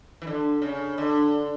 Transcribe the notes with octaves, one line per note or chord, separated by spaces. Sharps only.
E3
D3
C#3
D3